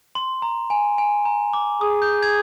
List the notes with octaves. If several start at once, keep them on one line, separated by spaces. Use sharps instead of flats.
C6
A#5
G#5
G#5
A#5
D6
G#4 D#6
G6
G#6